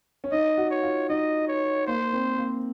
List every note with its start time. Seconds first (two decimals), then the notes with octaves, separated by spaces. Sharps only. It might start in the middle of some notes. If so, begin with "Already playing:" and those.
0.24 C#4
0.32 D#4 D#5
0.58 F#4
0.71 C#5
0.83 F4
1.09 D#4 D#5
1.48 C#5
1.87 A#3 C5
2.13 C4
2.38 A#3